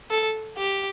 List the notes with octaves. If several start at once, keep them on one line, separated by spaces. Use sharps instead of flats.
A4
G4